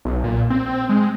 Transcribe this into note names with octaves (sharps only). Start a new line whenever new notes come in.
B1
A#2
C4
G#3